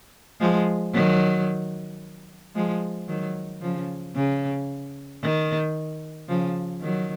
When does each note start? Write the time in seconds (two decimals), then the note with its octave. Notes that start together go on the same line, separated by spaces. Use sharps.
0.41 F3 G#3
0.94 D#3 F#3
2.55 F3 G#3
3.08 D#3 F#3
3.62 C#3 F3
4.15 C#3
5.23 D#3
6.28 C#3 F3
6.82 D#3 F#3